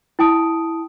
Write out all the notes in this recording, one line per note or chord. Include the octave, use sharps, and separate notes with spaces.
E4 G5 A5 D#6 D7